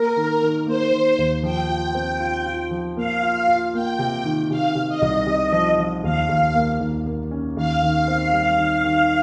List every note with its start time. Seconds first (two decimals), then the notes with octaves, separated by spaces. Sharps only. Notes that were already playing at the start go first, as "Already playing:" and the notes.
Already playing: A#3 A#4
0.16 D#3
0.42 D#3
0.67 A#3 C5
0.92 D#3
1.18 D#2
1.43 F3 G5
1.69 F4
1.95 C4
2.20 F4
2.46 F4
2.71 F3
2.97 A#3 F5
3.23 F4
3.47 F4
3.74 A#3 G5
3.99 C3
4.24 D#3
4.50 C3 F5
4.75 C3
4.88 D#5
5.02 C2
5.27 C3
5.52 F3
5.79 F3
6.03 D#2 F5
6.29 D#2
6.55 A#3
6.80 D#2
7.06 A#3
7.31 C#4
7.57 D#2 F5
7.82 D#3
8.08 C4
8.33 G3
8.59 D#3
8.84 D#3